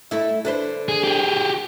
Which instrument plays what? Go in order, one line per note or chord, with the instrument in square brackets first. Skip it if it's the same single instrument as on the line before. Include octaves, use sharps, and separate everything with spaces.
[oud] A3 E4
D3 B4 C5
[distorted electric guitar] G#4
G4 G#4